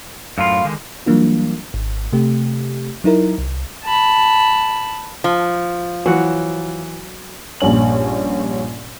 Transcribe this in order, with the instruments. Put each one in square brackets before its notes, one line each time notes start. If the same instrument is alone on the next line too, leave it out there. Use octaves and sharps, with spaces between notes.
[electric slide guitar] F#2 A2 F4 [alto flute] F5
[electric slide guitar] D3 D#3 G#3
[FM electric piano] E3 F#3 G3 A#3 D4 F4
G#1
C3 A3 G4
F#3 D#4 E4 A#4
C2
[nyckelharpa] A5 B5
[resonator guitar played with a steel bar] F3
[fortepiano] E3 [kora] F#3 F#5
[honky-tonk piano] A#1 G2 C#4 F#7